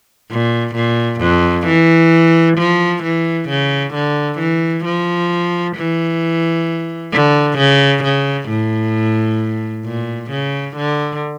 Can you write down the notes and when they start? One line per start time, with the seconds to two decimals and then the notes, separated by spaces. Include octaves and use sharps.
0.31 A#2
0.75 A#2
1.21 F2
1.67 E3
2.57 F3
3.03 E3
3.49 C#3
3.94 D3
4.39 E3
4.85 F3
5.76 E3
7.12 D3
7.58 C#3
8.03 C#3
8.49 A2
9.85 A#2
10.31 C#3
10.76 D3